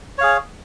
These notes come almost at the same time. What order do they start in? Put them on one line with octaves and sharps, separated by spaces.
C#5 F5 G#4